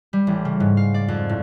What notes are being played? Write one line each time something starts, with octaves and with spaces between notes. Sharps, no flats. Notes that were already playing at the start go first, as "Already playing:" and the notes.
G3
A1
C#3
G#2
F5
D5
F2
A2